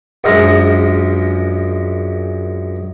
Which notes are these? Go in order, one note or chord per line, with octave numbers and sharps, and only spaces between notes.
A#1 F#2 G#3 A#4 D#6